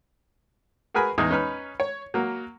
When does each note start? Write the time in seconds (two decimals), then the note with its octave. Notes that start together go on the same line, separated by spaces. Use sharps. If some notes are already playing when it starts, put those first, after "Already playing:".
0.94 F#4 G#4 A#4 B4 G#5 B5
1.18 E2 G#3 D#4 G#4 D#6
1.30 C#4 D#4 B4 B5 F6
1.80 C#5
2.14 F#3 A#3